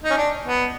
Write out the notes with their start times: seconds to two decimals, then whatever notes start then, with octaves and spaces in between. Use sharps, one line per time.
0.04 D#4
0.11 C#4
0.17 D4
0.46 B3